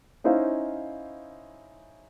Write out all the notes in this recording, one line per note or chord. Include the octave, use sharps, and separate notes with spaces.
C#4 D#4 E4 C5 F5